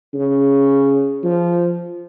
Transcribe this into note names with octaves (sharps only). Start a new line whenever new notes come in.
C#3
F3